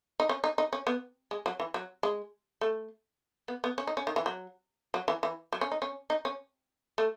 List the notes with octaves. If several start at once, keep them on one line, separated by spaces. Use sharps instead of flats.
D#4
C#4
D#4
D#4
C#4
B3
G#3
F#3
E3
F#3
G#3
A3
B3
B3
C#4
D#4
C#4
D#3
E3
F#3
F#3
E3
E3
F#3
C#4
D#4
C#4
D#4
C#4
A3